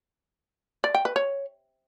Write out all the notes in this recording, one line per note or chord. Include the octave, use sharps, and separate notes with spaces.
D5
G5
B4
C#5